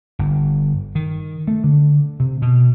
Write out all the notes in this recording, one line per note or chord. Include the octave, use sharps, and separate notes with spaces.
G1
D#3
A3
D3
C3
B2